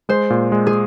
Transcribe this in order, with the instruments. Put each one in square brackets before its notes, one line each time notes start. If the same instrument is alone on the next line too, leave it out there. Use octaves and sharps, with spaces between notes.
[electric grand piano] G#3 [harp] C5
[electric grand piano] A#2
G#3
[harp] G#4